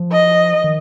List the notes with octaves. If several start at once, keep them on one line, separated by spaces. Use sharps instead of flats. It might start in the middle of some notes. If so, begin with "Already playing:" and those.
Already playing: F3
D#5
D#3